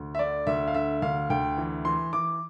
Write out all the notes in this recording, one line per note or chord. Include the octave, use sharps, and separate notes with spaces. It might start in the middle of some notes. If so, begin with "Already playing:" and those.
Already playing: D2
E5
D3 D5
D2 E5
F5
D3 E5
D2 F5
D2 G5
E3
E3 C6
E3 D6